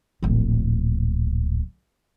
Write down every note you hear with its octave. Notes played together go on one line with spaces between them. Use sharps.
D1 A#1